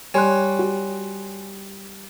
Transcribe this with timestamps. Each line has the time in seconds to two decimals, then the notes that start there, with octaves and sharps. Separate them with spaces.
0.14 G3 C#5 G#5 C6 F#6
0.59 F#4 G4